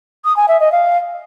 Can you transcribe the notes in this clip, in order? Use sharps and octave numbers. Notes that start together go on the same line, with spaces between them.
D#6
G#5
E5
D#5
F5